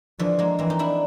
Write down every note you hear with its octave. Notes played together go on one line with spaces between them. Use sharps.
D3 E3 F3
G#3 A#3
E3 A#3 C4
D#4
D4 E4